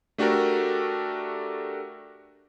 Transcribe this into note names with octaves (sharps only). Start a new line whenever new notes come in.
A3 D4 F#4 G4 A4 A#4